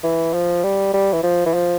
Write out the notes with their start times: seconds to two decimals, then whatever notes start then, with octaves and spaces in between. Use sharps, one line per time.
0.04 E3
0.34 F3
0.63 G3
0.93 G3
1.13 E3
1.23 F3
1.46 E3
1.54 F3